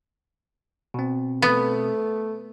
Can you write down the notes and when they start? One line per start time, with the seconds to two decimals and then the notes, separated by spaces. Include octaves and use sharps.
0.94 B2 C4
1.42 A3 B3